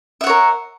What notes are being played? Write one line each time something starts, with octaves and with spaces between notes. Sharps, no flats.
A#4 C#5 E5 F#5